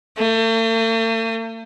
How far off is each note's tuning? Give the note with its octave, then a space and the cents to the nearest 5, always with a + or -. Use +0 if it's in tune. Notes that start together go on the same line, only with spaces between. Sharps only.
A3 +45